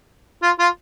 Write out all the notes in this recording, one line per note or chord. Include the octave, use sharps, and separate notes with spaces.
F4
F4